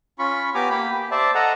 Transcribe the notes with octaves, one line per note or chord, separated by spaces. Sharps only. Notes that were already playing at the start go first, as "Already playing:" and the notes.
C#4 F4 B5 C#6
B3 G4 G#5 A#5 D6 D#6
A#3 G4 B5
G4
C5 D5 E5 A5
A4 D#5 F#5 A#5